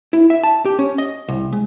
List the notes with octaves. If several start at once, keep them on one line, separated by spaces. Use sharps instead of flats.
E4
E5
A5
G4
C#4
D#5
C2
G#3